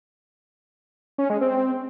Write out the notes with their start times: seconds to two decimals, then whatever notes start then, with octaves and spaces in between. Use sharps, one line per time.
1.18 C#4
1.30 G#3
1.41 C4